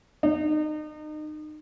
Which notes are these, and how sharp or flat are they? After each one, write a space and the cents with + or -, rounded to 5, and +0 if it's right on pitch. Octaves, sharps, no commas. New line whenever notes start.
D#4 -30